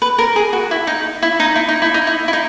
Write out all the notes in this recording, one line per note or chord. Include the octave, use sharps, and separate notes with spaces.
B4
A#4
G#4
F#4
E4
D#4
E4
D#4
E4
D#4
E4
D#4
E4
E4
D#4